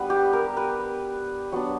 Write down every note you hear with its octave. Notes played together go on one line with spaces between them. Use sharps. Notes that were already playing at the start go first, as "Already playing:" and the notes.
Already playing: G3 B3 D4 B4
G4
A#4
B4
F#3 B3 D4